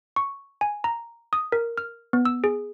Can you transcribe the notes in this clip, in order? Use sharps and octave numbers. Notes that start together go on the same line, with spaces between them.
C#6
G#5
A#5
D#6
A#4
F6
B3
E6
G#4